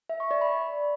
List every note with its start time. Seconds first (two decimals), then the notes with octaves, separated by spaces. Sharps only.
0.09 E5
0.20 C#6
0.31 D5
0.41 B5